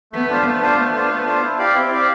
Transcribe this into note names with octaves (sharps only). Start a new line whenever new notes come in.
A3 B3
D4 F4 C5
A3 B3
D4 F4 C5
A3 B3
D4 F4 C5
A3
D4 F4 C5
E4
G4 D5 F5
C4 E4
G4 D5 F5